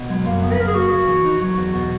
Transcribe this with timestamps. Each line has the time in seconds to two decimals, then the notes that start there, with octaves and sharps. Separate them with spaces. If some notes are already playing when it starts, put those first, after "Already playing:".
Already playing: B2
0.09 F#3 G#3
0.26 F#2 A#3
0.42 C#3 B3
0.52 B4
0.58 F#2 A#4
0.67 G#4
0.75 A#3 F#4
0.91 C#3
1.08 E3
1.25 D#4
1.41 F#3 F#4
1.57 E2
1.74 B2